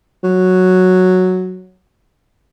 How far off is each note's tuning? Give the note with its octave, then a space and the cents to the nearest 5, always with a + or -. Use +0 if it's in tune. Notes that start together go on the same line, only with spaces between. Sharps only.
F#3 -5